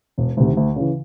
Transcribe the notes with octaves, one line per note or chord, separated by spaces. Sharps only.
E1
D2 C3 D#3
D2
C#3 E3